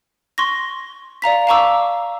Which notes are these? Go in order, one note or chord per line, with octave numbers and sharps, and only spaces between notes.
C6 C#6 A#6
D5 F5 A#5 B6
F5 A5 A#5 C#6 D6 E6